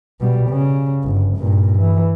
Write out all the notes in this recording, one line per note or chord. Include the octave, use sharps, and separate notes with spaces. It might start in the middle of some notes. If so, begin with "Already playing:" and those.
B2 G3
C#3
G1
G2 A#2
E3